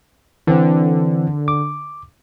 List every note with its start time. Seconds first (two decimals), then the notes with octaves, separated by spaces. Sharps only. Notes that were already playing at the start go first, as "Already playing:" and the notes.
0.47 D3 E3 C4
1.48 D6